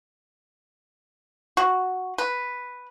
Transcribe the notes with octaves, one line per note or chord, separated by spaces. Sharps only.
F#4
B4